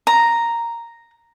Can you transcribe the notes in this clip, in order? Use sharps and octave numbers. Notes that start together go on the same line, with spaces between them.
A#5